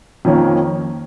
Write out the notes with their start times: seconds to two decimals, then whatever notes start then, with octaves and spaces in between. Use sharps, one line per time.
0.25 F2 D#3 A#3 C#4